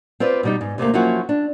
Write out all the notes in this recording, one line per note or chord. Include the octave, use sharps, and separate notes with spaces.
C4 F4 B4 D5
B2 G3 D#4
G#2
D2 C3 A3 A#3
F3 F#3 A#3 C#4 E4 F#4
D4